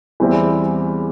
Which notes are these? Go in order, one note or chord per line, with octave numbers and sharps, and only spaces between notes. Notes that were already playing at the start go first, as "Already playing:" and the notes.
E2 E3 G3 C4 E4